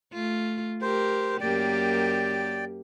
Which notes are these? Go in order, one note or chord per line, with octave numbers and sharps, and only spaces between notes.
A3 F4
G4 A#4 C5
F#2 A#3 G4 D5 G5